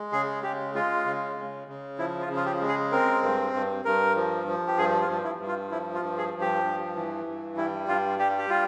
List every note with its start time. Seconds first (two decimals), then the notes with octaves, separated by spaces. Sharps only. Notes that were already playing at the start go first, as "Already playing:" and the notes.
Already playing: G#3
0.12 C#3 G#4
0.43 G#3 G4
0.75 G#3 F4
1.06 C#3
1.37 C#3
1.68 C#3
1.99 F3 E4
2.22 F4
2.30 C#3
2.36 F4
2.45 G4
2.61 G#3
2.68 G#4
2.92 C4 A#4
3.22 G2
3.54 G2
3.85 G2 A#4
4.16 F3
4.48 F3
4.67 G4
4.78 G2 G#4
5.01 F4
5.09 G2
5.24 E4
5.40 G2
5.48 F4
5.71 F3 E4
5.94 F4
6.02 G2
6.18 G#4
6.34 F3
6.41 G4
6.64 G2
6.95 E3
7.26 G2
7.57 G3 E4
7.88 G2 F4
8.19 G3 G4
8.39 G4
8.50 F4